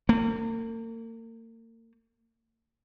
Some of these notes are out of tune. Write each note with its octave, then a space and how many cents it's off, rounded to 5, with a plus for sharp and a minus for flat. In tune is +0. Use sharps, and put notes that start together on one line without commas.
A#3 -40